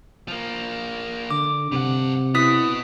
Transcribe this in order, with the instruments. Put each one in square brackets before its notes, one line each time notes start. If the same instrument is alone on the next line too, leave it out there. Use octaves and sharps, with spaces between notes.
[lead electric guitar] F3 A#3
[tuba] D3 [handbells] D6
[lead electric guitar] G2 F#5 [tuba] C3
[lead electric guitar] B3 F#4 [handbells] E4 D#6 B6